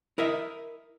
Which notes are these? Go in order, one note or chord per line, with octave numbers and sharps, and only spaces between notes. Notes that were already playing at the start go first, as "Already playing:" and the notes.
E4 A#4 D#5 E5